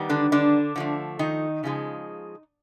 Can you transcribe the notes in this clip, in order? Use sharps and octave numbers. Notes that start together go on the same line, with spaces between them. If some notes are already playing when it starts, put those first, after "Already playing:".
Already playing: D#3 G3 B3
D3 D4
D3 D4
D3 F3 A3
D#3 D#4
C#3 F3 G#3